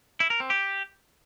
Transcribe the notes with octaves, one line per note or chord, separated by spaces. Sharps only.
E4
A#4
C4
G4